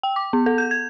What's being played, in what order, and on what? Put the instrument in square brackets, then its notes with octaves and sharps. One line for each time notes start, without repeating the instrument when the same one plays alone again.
[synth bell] G5
D6
B3
A4
G6
G#6